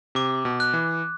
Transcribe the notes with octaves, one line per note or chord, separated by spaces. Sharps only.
C3 D6
B2
F#6
E3